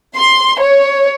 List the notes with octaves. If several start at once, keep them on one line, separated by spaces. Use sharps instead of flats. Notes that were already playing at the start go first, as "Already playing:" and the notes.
C6
C#5